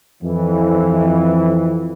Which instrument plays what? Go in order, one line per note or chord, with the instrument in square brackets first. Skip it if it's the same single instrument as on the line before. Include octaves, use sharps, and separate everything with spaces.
[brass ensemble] F2 E3